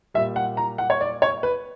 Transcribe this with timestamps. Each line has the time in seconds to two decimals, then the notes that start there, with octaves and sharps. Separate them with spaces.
0.14 A#2 G3 E5
0.36 F#5
0.57 A#5
0.78 F#5
0.90 C#5
1.01 D5
1.22 C#5
1.43 B4